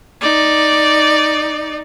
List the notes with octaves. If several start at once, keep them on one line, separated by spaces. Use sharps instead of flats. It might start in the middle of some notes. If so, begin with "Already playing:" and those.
D#4 D5